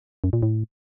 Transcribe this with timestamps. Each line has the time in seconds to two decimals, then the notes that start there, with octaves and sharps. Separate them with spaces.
0.24 F#2
0.33 A#2
0.43 A2